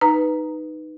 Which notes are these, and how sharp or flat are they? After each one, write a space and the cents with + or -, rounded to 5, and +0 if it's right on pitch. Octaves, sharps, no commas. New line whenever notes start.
D#4 -5 B4 +0 A#5 +0